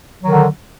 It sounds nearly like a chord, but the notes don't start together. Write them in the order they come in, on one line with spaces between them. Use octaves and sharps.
F#3 D#3 D3